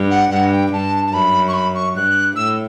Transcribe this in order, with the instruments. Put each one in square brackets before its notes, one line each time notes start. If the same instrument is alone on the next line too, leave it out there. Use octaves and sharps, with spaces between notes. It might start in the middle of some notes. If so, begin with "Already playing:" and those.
Already playing: [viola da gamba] G2
[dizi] F#5
[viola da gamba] G2 [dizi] F#5
[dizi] G5
[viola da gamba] G2 [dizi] A5
[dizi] A5
[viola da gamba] F#2 [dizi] B5
[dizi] C#6
B5
C#6
[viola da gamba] G2 [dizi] F#6
[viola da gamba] A2 [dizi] E6